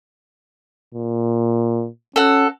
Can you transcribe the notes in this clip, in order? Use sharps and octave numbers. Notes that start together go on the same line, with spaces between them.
A#2
C#4 F#4 A4